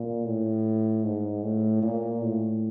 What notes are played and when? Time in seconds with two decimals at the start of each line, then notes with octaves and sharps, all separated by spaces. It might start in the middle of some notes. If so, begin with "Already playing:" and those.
Already playing: A#2
0.26 A2
1.04 G#2
1.43 A2
1.82 A#2
2.22 A2